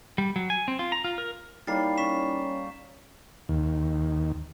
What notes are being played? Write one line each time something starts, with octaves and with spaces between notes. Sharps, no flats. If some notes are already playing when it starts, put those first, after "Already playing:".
G3
F#3
G#5
C4
F4
A#5
F4
A#4
G3 A#3 D#4 E4 C#5 A6 C7
C#4 C#6 B6 E7
D#2